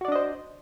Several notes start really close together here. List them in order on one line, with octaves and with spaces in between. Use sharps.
F#4 D5 D4 D#5 C5